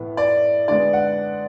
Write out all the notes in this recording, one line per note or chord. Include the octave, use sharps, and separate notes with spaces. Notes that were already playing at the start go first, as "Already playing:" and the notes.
Already playing: A2 E3 B3
D5
D3 G#3 B3 D5
F#5